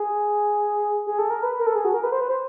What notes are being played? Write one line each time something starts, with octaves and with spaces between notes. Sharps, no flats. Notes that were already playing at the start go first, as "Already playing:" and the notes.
Already playing: G#4
G#4
A4
A#4
B4
A#4
A4
G#4
F#4
A#4
B4
C5
B4
C5